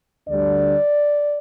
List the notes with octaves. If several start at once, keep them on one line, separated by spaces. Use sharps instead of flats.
D2 D3 G3 D4 D5